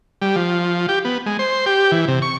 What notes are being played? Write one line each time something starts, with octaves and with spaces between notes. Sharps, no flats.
G3
F3
G4
B3
G#3
C5
G4
E3
C3
C#6